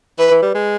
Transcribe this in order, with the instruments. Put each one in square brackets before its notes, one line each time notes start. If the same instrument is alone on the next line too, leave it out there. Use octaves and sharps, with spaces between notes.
[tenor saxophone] E3 [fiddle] B4
[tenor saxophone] E3
G3
G#3